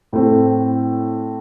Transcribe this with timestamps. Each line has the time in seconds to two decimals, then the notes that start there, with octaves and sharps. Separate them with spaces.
0.13 A2 A3 C4